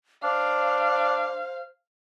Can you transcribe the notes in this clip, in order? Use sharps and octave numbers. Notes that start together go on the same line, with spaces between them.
D4 C5 F5